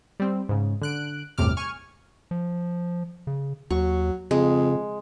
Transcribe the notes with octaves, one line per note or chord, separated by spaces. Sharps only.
G3 C4
G#2 C#3
D3 F#6 D7
G1 E2 A2 C3 D6 F6
G#5 C#6 F6
F3
C#3
D#2 F#3 C#6
F2 C#3 G#3